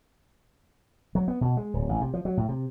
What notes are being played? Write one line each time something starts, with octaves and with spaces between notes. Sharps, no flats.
F#3
B3
B2
G#3
D1
A1
C3
F3
F#3
A2
C3